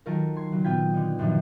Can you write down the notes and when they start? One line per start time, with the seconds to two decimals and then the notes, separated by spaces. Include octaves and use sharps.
0.06 D#3 F#3 F4 A4 A#4
0.36 C6 G#6
0.52 C#3 F#3
0.64 A#2 B3 F4 G5 G#6 B6
0.94 D3 D#4
1.19 F#2 A#2 D3 D#3 F3